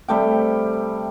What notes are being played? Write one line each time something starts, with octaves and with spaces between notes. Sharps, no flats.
C3 G3 A3 G5